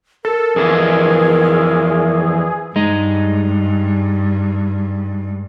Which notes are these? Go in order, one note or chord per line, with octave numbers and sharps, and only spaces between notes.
A4 A#4
F2 E3 G#4
G2 G#3 D#4